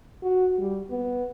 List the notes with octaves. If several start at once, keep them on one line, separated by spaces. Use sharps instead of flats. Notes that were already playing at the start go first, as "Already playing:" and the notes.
F#4
G3
B3